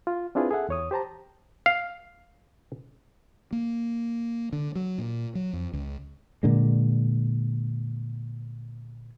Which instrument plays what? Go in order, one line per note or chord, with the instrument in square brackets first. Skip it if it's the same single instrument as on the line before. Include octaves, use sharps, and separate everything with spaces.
[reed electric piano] F4
C4 D4 E4 F4 G#4 B4
G#4 A4 E5 F#5
E2 C#5 D#6
G4 C5 A5 A#5
[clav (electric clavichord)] F5
[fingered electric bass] A#3
D3
F#3
A#2
F#3
F2
C#2
[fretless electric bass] A#2 D3 G#3